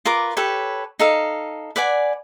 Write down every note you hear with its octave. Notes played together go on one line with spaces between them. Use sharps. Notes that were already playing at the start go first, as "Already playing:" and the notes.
F4 A#4 B4 D6
G4 A4 B4 C#5
D#4 A4 F5
B4 D5 F#5 G#5